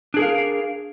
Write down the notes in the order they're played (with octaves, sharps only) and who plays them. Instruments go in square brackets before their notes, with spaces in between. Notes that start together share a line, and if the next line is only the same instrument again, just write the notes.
[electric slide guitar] D4
G#4
A#4
F5